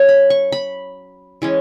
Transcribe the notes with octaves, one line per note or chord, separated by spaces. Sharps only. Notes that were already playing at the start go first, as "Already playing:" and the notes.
Already playing: F#3 C#4 C#5
B5
C#6
B5
E3 G#3 C#4